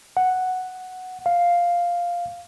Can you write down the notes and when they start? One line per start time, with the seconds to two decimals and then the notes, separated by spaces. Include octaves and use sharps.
0.17 F#5
1.26 F5